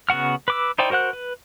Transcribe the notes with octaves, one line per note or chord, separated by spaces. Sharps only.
C#3 B3 F#4 F#5 F6
B4 D6 E6
D#4 E4 C5 D5 G5
F#4 A#4 C5 F#5 F#6
B4